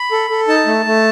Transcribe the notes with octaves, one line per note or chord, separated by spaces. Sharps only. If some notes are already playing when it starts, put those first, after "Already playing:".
Already playing: B5
A4
A4
D#4 A5
A3
A3